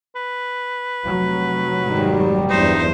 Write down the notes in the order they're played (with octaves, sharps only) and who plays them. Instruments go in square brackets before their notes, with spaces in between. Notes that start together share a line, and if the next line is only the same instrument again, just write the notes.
[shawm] B4
[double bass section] F1 F#3
[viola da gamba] G#2 D#3 [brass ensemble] G3
[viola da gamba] E2 G2 C5 [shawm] D#4